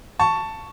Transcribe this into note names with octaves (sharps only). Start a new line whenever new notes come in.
A5 C#6